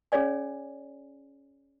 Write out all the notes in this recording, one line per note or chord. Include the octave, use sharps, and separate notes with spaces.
C#4 G#4 C#5 D5 G#5